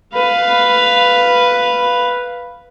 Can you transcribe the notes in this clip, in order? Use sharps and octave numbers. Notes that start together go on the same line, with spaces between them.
B4 F5